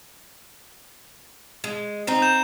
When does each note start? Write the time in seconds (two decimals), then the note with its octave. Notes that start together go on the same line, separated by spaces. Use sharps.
1.64 G#3
2.07 C4 D#4
2.22 G6 E7